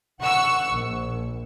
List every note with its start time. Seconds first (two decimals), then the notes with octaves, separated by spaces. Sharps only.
0.21 F#5 C#6 E6
0.71 A#1